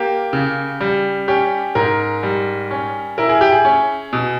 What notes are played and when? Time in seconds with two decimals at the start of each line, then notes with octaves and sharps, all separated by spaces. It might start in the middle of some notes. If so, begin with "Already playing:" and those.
Already playing: A#3 G4
0.33 C#3
0.81 G3
1.28 C#4 G4
1.75 G#2 A#4
2.23 G3
2.71 C#4
3.18 E4 A#4
3.29 G#4
3.41 G4
3.52 G#4
3.65 C#4
4.13 B2